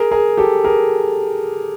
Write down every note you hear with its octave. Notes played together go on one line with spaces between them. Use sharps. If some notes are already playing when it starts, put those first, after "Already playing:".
Already playing: G#4 A#4
G#4 A#4
G4 A4
G#4 A#4